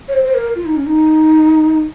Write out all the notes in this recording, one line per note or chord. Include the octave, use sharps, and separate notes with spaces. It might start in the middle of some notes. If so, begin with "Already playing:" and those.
C#5
C5
C5
A#4
F4
D#4
C#4
D#4